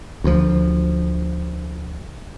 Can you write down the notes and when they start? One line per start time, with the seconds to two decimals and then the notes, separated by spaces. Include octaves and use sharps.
0.24 D2 F3